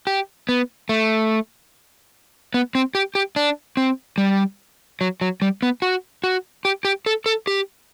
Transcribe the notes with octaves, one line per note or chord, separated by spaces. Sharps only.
G4
B3
A3
B3
C4
G4
G4
D4
C4
G3
F#3
F#3
G3
B3
F#4
F#4
G4
G4
A4
A4
G4